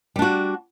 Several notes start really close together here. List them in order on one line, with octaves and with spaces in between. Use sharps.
G3 D4 F#4